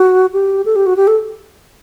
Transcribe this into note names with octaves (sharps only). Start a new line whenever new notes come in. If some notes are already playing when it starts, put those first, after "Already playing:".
Already playing: F#4
G4
A4
G4
F#4
G4
A4